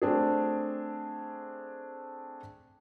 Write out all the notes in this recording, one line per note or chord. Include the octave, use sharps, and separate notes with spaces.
A3 C4 D4 G#4